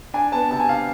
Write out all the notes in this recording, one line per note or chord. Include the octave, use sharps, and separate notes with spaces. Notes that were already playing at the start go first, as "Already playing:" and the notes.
D4 G#5
B3 A5
C3 A5
G#5
D4 F5